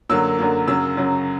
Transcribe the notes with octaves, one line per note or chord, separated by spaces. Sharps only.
F#2 D3 F#3 A#3 E6
F#2 D3 F#3 A#3
F#2 C#3 F#3 E6
F#2 C#3 F#3